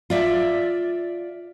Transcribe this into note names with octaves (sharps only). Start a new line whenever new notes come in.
F4 D5 E5